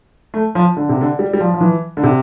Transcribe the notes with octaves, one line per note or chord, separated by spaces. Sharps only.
A3
F3
D3
C3
D3
G3
G3
F3
F3
E3
D3
C3